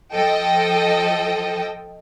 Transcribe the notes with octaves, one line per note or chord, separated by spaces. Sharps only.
F3 A4 D#5 G5